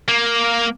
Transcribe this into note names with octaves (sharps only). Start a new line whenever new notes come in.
A#3